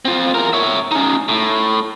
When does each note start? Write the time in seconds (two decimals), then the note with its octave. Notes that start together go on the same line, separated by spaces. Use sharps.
0.05 C4 F4
0.35 E2 A#4
0.53 C#5 E5
0.91 C#4 D#4
1.29 A2